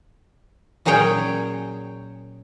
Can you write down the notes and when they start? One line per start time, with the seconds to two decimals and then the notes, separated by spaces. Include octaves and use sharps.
0.85 A#2 F#3 C#4 G#4 C#5 G5